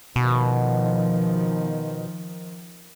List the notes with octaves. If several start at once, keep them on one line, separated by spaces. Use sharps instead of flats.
B2 D#3 F3